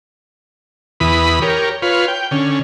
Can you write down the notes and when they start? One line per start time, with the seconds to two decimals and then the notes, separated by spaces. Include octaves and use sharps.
1.00 E2 E3 B4 B5 D#6
1.42 G4 A#4 C#5
1.82 F4 B4 C#5
2.08 G5
2.31 D3 C#4